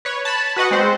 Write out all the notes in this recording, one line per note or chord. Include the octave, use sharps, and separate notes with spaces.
B4 C#5
A5 B5
F#4 B4 D#5 F#5
G#3 C4 C5